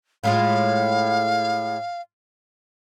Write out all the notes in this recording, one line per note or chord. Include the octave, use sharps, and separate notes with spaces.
A2 G#3 F4 F5